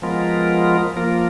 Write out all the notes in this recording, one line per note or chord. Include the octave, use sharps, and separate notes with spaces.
F3 G#3 B3 F4 A#4
F3 A#3 F4 A#4